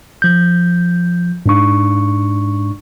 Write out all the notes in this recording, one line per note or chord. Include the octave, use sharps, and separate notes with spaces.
F3 G6
G#2 D4 C#6